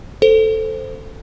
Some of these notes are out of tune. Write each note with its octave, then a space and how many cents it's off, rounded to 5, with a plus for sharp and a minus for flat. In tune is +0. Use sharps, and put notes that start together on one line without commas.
A4 +0 C5 -5